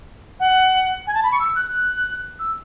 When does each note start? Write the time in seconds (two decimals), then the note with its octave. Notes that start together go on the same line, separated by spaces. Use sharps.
0.40 F#5
1.07 G#5
1.14 A5
1.23 B5
1.32 C#6
1.39 E6
1.55 F#6
2.39 E6